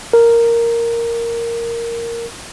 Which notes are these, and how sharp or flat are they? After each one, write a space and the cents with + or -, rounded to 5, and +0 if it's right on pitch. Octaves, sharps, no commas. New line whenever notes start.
A#4 -5